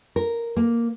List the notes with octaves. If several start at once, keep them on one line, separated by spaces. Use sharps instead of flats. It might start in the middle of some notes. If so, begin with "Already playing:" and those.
A#4
A#3